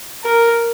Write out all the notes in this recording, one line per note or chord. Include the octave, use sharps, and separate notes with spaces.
A#4